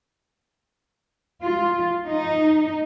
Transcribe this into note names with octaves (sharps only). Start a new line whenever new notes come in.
F4
D#4